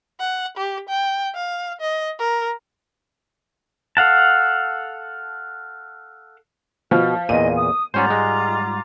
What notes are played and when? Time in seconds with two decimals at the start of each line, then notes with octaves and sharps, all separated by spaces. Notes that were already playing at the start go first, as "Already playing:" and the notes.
0.20 F#5
0.57 G4
0.89 G5
1.35 F5
1.81 D#5
2.19 A#4
3.97 A4 F5 F#5 A5
6.91 B2 F3 F5
7.29 E2 A#2 D#5 D#7
7.53 D#6
7.94 G#2 G3 C#4 F4 C5 F#5 A#5 D6
8.10 G#3